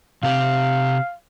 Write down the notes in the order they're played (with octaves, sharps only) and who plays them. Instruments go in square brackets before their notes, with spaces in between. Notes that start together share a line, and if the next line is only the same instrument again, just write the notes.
[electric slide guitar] C3 C4 G4 [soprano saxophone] F5